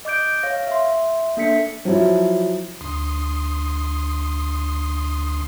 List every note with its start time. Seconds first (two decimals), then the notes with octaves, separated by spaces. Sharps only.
0.05 D#5 D6 G6 D7
0.43 C#5 F5 A#6
0.67 E5 C6
1.37 A#3 D4 A4 E5 B6 C#7
1.85 F3 F#3 E4
2.81 D2 C6 D#6